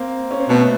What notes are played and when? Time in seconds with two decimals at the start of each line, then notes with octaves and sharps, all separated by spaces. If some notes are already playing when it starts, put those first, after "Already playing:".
Already playing: A#3 C4
0.31 C#4
0.40 C4
0.49 B2 A3 B3